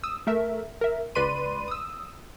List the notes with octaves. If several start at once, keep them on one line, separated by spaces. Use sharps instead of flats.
D#6 E6
A3 A#4 E5
A#4 E5
C#2 B4 D5 B5 C6 D#7
D#6 E6